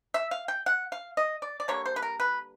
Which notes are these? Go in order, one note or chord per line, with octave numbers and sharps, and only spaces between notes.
E5
F5
G5
F#5
F5
D#5
D5
D5
D3 G3 A#3 C#5
C5
B4
A#4
B4